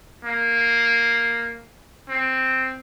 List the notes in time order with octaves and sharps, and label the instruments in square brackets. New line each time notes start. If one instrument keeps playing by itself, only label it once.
[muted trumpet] A#3
C4